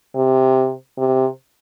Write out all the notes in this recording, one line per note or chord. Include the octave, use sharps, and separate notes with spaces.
C3
C3